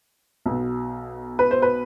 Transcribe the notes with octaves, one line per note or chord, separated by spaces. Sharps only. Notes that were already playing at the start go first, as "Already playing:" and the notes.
B1 B2
B4
C5
B4